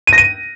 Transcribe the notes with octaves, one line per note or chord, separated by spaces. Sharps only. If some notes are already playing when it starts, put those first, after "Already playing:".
D#7
A#6
D#7